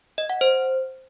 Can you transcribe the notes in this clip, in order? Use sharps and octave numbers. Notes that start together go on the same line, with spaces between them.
D#5
F#5
C5